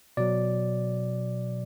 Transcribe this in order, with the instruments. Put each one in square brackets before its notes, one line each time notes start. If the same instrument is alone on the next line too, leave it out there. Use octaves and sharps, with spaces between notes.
[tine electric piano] B2 F#3 D5